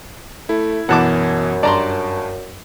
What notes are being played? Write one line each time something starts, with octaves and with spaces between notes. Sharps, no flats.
A3 E4
F#2 B2 E3 B3 F#5 A5 D6
G2 D5 A5 A#5 C6